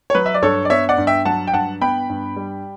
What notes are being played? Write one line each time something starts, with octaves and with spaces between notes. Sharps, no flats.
C#5
F#3 B4
E5
D5
G2 A4 C#5
D5
B3 C#5 E5
D5 F#5
G2
E5 G5
F#3 F#5 A5
G5
G2 F#5 A5
B3 G5 B5
G2
G3